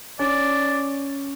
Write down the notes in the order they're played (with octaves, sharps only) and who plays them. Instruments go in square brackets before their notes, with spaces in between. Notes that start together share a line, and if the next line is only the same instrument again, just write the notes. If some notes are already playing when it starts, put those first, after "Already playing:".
[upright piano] C#4 [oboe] D5